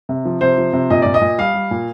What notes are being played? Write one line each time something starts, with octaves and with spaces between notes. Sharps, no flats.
C3
F3
C3 C5
F3
C3
A#2 D#5
A#2 D5
D#5
A#2
G3 F5
G3
A#2